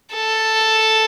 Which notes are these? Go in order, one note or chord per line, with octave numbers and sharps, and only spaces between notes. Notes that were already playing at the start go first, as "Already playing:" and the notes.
A4